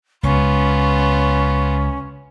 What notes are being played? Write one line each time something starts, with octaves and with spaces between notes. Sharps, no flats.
C#2 B3 C#4 F4